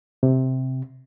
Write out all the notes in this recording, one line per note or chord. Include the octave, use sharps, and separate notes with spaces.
C3